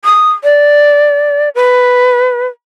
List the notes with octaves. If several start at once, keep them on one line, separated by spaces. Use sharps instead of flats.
D#6
D5
B4